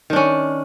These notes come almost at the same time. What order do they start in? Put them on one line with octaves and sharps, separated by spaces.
D#3 D4 C#4